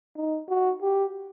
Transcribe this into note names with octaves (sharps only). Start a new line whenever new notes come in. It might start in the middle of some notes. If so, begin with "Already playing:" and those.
D#4
F#4
G4